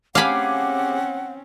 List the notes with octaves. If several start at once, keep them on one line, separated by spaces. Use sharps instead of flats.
C4 C#4 G4 G#4 F5 F#5 B5 D6